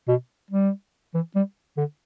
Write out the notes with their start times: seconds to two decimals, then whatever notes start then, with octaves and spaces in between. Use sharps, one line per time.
0.08 B2
0.51 G3
1.14 E3
1.36 G3
1.77 D3